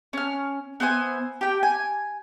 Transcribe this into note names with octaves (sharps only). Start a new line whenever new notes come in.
C#4 F6
B3 C5 E5 G#5
G4 G5
G#5